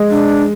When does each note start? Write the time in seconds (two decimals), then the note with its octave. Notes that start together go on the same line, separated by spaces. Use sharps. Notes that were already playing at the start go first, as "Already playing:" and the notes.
Already playing: G#3
0.10 D4